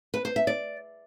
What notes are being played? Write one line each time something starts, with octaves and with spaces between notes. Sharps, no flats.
B4
C5
E5
D5